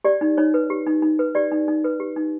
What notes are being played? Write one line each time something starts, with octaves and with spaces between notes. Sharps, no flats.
G4 D5
D#4
D#4 C#5
B4
G4
D#4
D#4
B4
G4 D5
D#4
D#4
B4
G4
D#4